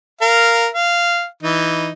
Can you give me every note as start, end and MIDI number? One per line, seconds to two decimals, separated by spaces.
0.21 0.68 70
0.21 0.68 77
0.74 1.25 77
1.43 1.90 52
1.43 1.90 63